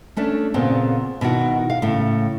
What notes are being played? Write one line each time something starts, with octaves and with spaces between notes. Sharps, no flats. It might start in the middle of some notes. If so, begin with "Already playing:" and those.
A3 C#4 D4
A#2 C#3 B3 C4
B2 D#3 E4 F#4
F5
A2 C#3